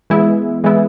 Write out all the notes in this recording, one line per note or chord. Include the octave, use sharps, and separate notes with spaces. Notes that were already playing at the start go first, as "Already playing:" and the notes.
E3 G#3 B3 E4
E3 G#3 B3 E4